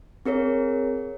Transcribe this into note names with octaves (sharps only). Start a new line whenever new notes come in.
C4 G#4 A#4 C#5